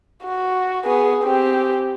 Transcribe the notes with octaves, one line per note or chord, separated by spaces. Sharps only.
F#4
B3 G#4
C4 G4